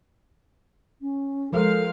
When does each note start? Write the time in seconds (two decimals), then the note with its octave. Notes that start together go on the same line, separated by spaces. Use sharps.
1.01 C#4
1.52 F3 G#3 A4 A#4 C5 F5